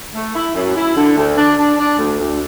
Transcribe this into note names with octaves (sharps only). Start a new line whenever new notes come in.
A3
E4
F#2
E4
D3
D2
D4
D4
D4
D2
D2